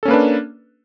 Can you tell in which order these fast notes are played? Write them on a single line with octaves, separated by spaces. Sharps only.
A4 C#4 A#3 B4 D4